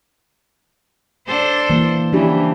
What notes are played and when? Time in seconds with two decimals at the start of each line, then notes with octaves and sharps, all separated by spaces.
1.26 D4 A4 C5
1.70 E3 A#3
2.13 C#3 E3 F3 D4 G4